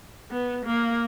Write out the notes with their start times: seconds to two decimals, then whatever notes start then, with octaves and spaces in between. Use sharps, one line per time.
0.31 B3
0.65 A#3